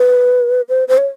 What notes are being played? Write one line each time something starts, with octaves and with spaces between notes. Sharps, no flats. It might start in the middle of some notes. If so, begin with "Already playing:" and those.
Already playing: B4
C5
C5
C#5